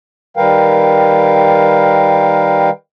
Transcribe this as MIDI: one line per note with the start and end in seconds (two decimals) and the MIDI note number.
0.37 2.70 51
0.37 2.70 55
0.37 2.70 70
0.37 2.70 71
0.37 2.70 77
0.37 2.70 79